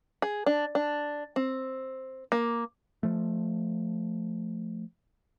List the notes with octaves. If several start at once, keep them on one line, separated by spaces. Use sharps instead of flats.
G#4
D4
D4
C4
A#3
F3 A3